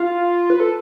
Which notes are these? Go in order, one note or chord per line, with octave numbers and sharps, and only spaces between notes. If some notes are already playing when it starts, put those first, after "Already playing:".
Already playing: F4
B4
A4